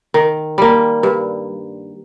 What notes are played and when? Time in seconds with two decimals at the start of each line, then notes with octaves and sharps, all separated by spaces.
0.14 D#3
0.58 G3 A#3
1.03 G2